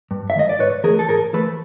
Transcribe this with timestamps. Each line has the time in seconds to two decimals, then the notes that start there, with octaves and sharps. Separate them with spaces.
0.11 G2
0.30 E5
0.35 D#3 G#3 D#5
0.49 D5
0.60 G#2 B4 C#5
0.84 E3 G#4 A#4
0.87 A3
0.99 A4
1.09 G#2 G#4 A#4
1.33 E3 A3 A4 B4